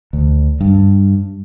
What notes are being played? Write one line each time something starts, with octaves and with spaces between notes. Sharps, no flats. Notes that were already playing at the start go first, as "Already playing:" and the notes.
D2
G2